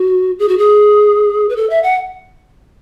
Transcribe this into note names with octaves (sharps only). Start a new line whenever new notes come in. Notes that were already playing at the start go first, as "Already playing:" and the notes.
Already playing: F#4
G#4
F#4
G#4
B4
A4
E5
F#5